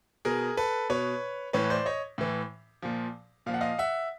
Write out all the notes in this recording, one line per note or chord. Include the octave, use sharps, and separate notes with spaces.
B2 G#4 A#4
A4 B4
B2 B4 C#5
A2 E3 B4 C#5
C5 D5
C#5 D#5
A2 E3
A#2 F3
A#2 F3 F5
F#5
D#5 F5
E5 F#5